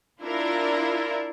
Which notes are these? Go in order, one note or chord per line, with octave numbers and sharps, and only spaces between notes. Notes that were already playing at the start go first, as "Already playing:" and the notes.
D4 E4 F4 A#4